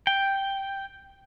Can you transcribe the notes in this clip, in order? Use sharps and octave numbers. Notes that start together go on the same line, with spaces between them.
G5